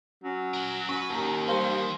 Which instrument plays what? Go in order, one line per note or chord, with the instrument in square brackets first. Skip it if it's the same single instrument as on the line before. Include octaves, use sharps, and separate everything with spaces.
[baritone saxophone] F#3 [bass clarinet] C#4
[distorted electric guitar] A#4 F#5
[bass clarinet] C#4 [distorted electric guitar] B4 [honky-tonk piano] C#6
[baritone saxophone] D#2 [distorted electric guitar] D#3 [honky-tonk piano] A5 A#5
[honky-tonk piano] G3 A#4 F5 [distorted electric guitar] C#4 [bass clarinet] C5
[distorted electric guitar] E3